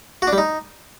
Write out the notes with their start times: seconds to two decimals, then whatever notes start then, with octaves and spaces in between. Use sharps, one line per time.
0.22 F#4
0.27 D4
0.33 G3
0.38 D#4